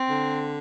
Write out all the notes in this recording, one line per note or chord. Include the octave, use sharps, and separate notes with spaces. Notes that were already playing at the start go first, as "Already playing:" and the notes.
Already playing: C4
D3